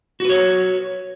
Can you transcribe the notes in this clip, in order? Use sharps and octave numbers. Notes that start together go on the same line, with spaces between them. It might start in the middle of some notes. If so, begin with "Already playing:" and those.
F#4 B4 C#5